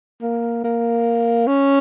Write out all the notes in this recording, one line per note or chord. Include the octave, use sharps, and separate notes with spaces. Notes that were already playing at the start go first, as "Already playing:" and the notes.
A#3
A#3
C#4